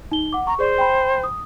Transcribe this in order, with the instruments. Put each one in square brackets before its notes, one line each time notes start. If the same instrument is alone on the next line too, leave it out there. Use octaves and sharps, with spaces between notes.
[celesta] D#4 G7
F#5 D6
[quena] A#5 [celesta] C#6
[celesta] G#4 D5 [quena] C5
[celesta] G5 B5
D#6